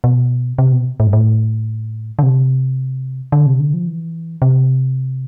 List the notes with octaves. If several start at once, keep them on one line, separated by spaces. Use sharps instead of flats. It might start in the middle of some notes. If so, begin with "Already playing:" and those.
B2
C3
B2
A2
G2
A2
D3
C3
D3
C3
D3
F3
E3
C3